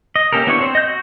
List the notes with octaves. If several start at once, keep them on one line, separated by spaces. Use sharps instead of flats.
D#5
A#3 C#4 G4 A4 A#4
B3 D4 E4 G4 C#5
C4 C5
D#5 G6
F#4